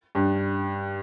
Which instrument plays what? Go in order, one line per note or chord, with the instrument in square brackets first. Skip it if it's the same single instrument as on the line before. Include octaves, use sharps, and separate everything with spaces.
[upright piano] G2